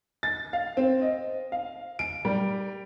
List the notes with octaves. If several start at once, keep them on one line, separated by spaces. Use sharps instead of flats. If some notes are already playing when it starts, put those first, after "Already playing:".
A6
F5
C4
D#5
F5
D7
G3